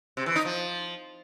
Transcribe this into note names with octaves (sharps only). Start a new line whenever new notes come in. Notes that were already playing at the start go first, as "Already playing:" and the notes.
C3
E3
D#4
F3